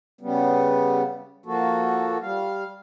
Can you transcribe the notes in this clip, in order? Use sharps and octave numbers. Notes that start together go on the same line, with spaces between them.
C#3 G3 B3
F3 A#3 F#4 A4
G3 F5